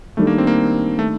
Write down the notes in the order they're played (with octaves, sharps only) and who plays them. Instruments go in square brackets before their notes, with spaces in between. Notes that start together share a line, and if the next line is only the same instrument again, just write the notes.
[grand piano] D#3 G3 D4 A4 [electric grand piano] A3
[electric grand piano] A#3
C4
A#3
A3